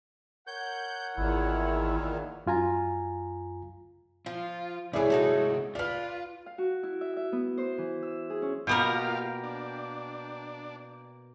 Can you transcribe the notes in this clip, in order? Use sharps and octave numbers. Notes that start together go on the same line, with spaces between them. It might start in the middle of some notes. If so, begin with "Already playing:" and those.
A#4 C#5 F#5 G6
G#1 E2 A#2 D#3 E4
F#2 F4 G#5 A#5
F3 F4
C3 E3 G#3 A3 E4 G#4 C#5 D5
D#4 F#4 A4
D4 F4 B4 F5 F6
F5
F#4
E4
E5
E5
B3
C5
E3
E6
G#4
C#4
B2 A#3 B3 F4 G4 A#4 F5 G5
D4